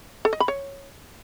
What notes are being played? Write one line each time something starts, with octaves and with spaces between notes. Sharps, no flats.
A4
D#5
B5
C#5